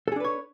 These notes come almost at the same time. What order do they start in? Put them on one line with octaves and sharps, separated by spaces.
A4 G#4 D4 B4 C#5